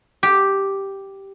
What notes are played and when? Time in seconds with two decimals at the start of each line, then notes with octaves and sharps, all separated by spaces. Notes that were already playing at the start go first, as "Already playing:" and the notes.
0.23 G4